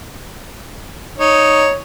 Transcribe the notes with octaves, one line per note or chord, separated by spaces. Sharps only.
D#4 C#5